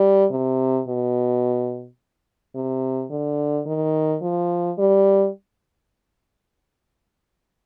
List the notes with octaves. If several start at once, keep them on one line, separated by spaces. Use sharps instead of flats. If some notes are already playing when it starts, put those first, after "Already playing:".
Already playing: G3
C3
B2
C3
D3
D#3
F3
G3